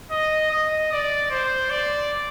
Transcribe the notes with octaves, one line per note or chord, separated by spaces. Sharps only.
D#5
D#5
D5
C5
D5